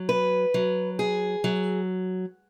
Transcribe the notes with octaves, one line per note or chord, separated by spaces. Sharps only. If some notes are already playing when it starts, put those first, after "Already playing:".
Already playing: F#3
B4
F#3
G#4
F#3